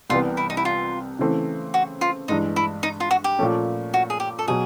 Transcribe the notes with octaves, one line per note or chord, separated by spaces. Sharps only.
C2 C3 E3 G3 B3 F4
E4
D#4
E4
F4
C#3 E3 A3 C4
F#4
F4
G2 E3 G#3 D#4
E4
D#4
F4
F#4
G4
A#2 F3 A3 C#4
F#4
G#4
G4
A4
B2 F#3 G#4